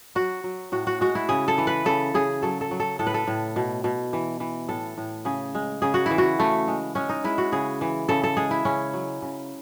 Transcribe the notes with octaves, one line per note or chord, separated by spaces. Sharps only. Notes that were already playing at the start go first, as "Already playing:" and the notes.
F#3 F#4
F#3
A2 F#4
F#4
G#3 F#4
E4
C#3 G#4
A4
E3
B4
C#3 A4
C#3 G#4
F#3 A4
A4
F#3
A4
A2 A4
B4
A4
A2
B2
B2
E3
E3
A2 A4
A2
C#3 G#4
G#3
C#3 G#4
F#4
E3 E4
F#4
C#3 A3
G#3
G#3 C#4
D#4
G#3 E4
F#4
C#3 G#4
E3
C#3 A4
A4
G#3 G#4
E4
C#3 C#4
F#3
C#3